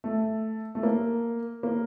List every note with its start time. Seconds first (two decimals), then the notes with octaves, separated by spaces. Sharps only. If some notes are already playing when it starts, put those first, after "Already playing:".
0.04 A3
0.75 A3
0.83 A#3
1.63 A#3